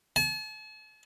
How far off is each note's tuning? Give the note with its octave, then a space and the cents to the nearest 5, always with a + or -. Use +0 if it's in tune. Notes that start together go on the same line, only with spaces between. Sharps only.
A5 -45